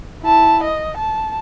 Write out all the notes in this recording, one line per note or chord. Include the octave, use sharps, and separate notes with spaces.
E4 A5
D#5
A5